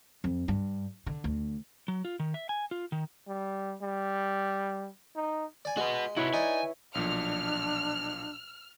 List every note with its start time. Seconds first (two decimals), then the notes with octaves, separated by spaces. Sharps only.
0.24 F2
0.48 G2
1.06 D3
1.24 D2
1.88 F#3
2.05 F4
2.20 D#3
2.34 E5
2.49 G#5
2.71 F4
2.92 D#3
3.27 G3
3.82 G3
5.16 D#4
5.65 D5 G#5
5.77 G#3 F#4 B4
6.17 C3 E4 F#4 B4 C#5
6.33 D#4 D5 G#5
6.95 B1 A#2 F3 D4 F6